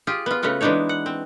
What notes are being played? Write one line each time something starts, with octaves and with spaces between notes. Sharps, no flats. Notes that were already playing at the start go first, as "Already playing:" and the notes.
F4 G4 G#4
B3 F4
C#3 A3 B3 F4 F#4
E3 G#3 B3 D4 D#4 C#5
F#5
C4